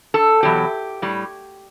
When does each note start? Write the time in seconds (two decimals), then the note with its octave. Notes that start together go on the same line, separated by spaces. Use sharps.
0.14 A4
0.43 E2 B2 F#3 G4
1.02 A2 G3